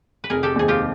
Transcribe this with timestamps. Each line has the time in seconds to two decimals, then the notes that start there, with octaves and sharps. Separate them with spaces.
0.24 B4
0.30 F1 G#4 A#4
0.43 G4 A4
0.56 D#2 D#3 G#3 C4 G#4
0.68 F4 G4